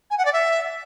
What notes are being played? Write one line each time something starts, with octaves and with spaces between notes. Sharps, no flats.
G#5
F#5
D5
E5